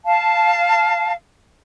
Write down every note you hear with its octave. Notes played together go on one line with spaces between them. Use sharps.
F5 A5